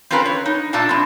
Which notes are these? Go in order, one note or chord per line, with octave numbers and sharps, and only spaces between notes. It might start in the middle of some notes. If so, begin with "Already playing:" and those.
C4 C#4 F4 A#4 B4
C#5
D#4
A#2 A3 D4 F4 A5
G3 C4